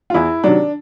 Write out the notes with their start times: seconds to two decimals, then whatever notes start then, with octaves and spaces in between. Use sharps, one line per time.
0.10 F4
0.14 E2 E4
0.44 C3 D#3 F#3 D4